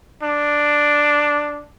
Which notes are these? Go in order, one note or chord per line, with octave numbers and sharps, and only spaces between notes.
D4